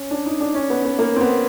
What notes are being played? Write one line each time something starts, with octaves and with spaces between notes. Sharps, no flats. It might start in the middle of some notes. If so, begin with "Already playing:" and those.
Already playing: C#4
D4
D#4
D4
C#4
B3
B3
A#3
C4
B3